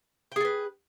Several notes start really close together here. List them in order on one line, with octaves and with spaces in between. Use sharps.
G5 G#4 A4 B4